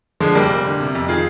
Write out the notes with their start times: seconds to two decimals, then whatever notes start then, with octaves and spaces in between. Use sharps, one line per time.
0.20 D3 F3 G#3
0.35 F1 G3 A#3
0.51 F1
0.65 D3
0.80 C3
0.95 F2
1.09 D#3 F4 G#4